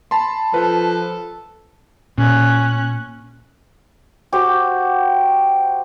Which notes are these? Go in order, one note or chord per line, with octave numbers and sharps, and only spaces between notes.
A5 B5 C6
F3 A4 B4
A#2 C#4 F#6
F#4 G4 C5